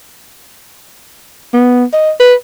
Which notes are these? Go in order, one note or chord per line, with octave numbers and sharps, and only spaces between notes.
B3
D#5
B4